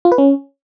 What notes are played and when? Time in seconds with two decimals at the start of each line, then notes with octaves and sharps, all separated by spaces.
0.05 F4
0.12 B4
0.18 C#4